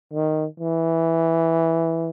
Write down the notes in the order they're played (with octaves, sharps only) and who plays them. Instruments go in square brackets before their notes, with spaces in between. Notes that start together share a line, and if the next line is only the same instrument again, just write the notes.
[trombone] D#3
E3